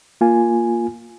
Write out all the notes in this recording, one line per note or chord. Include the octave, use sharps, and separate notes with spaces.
A#3 F4 G#5